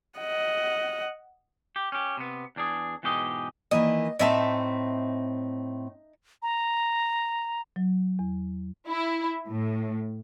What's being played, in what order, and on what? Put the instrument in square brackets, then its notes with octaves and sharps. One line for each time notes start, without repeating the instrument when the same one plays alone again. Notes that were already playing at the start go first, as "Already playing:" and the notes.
[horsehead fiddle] D#5 F#5
[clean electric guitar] G4
C#4 G4
C3 B3
E2 D4 G#4
E2 G#2 B2 G4 G#4 D#5
[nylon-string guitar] D#3 E3 A#3 [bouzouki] D#5
[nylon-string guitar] A2 C4 G5 [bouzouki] D#4 E5 A5
[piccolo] A#5
[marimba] F#3
E2
[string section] E4
A2